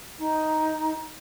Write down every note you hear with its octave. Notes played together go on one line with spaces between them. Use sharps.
D#4